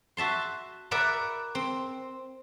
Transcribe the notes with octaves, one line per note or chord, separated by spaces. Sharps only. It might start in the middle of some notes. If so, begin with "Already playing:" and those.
F#4 E5 A5 C6
A#4 B4 D5 E5 F#5 B5
C4